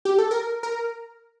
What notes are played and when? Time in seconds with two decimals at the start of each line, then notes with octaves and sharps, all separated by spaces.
0.05 G4
0.19 A4
0.31 A#4
0.63 A#4